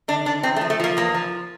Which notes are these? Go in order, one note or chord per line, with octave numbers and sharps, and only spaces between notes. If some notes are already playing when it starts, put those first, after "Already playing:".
D3 D4
D3 D4
E2 C4
A3
F3
A3
F3 A#3
E2 A#3
F3